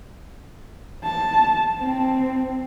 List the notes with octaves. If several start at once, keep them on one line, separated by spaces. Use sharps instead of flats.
A5
C4